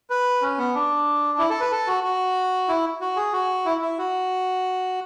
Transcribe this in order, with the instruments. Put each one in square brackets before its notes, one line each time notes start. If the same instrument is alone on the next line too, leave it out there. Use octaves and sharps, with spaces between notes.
[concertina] B4
C#4
B3
D4
E4
A4
B4
A4
F#4
F#4
E4
F#4
G#4
F#4
E4
E4
F#4